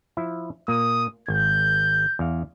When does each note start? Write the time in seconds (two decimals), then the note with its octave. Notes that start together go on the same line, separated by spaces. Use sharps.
0.17 F3 E4 E5
0.68 A#2 A#3 D#6
1.28 G#1 G6
2.19 E2 F5